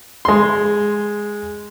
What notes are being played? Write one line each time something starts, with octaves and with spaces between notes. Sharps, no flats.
G#3 C6